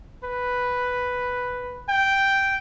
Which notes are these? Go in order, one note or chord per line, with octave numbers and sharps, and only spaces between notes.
B4
G5